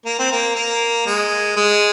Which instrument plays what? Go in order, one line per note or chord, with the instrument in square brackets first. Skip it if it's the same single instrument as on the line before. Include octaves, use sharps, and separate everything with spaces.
[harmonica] A#3
C4
A#3
A#3
G#3
G#3